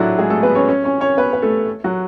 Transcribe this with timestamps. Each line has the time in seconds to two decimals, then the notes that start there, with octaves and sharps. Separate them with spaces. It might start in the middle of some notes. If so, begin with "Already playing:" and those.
Already playing: A2 F#3 A3 D4 E4 F#4
0.19 G#3 G#4
0.30 A3 A4
0.43 B3 B4
0.55 C#4 C#5
0.68 C#4 C#5
0.84 C#4 C#5
1.01 C#4 C#5
1.17 B3 B4
1.33 B4
1.42 A3 A4
1.84 F#3 F#4